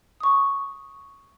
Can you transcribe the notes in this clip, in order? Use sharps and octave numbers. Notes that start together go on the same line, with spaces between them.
C#6 D#6